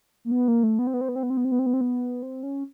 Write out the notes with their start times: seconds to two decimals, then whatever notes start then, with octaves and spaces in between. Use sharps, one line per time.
0.25 A#3
0.31 B3
0.48 A#3
0.63 A3
0.79 B3
0.87 C4
0.94 B3
1.01 C4
1.09 B3
1.16 C4
1.23 B3
1.30 C4
1.37 B3
1.45 C4
1.52 B3
1.59 C4
1.66 B3
1.74 C4
1.81 B3
2.23 C4
2.43 C#4